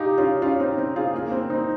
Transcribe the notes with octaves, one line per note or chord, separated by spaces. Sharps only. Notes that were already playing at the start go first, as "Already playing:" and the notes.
Already playing: D#4 F4 G4 G#4
C#4 F4
C#4 F4
C4 D#4
C4
F4 G#4
A#3
C4
C4 D#4